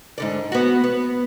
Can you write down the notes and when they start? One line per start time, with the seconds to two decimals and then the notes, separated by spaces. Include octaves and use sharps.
0.18 G#2 D3 D5
0.52 B3 F#4
0.84 B3